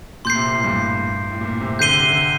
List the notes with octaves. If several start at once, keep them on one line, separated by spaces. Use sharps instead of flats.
A#2 C6 G6 C7
C3
A#2
A2
G2
A2
A#2
C3
D3 G6 C7 D#7 G7
C3
C3
D3